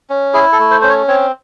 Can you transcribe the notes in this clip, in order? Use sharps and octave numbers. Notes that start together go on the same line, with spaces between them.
C#4
E4 G#4
A4
A3
C5
C#4 C5
C#5
C4 C#5